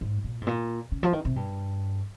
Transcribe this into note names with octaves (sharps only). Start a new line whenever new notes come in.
G#2
A#2
G#2
A#2
C#3
F3
D#3
C3
G2